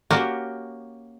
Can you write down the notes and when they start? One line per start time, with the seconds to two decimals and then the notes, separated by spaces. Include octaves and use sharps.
0.11 A#3 C#4 F#4 G4 A#4